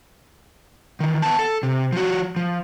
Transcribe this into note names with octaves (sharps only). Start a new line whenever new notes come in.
D#3 E3
B3 A5
A4
C3
F3 F#4
F3